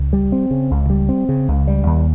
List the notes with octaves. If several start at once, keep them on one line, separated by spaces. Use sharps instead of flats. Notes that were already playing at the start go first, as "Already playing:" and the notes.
Already playing: C#2
G3
C4
C#3
C#2
G3
C4
C#3
C#2
G3
D#2